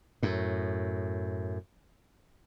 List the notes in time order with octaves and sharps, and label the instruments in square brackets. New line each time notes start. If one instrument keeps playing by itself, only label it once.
[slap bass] F#2 A2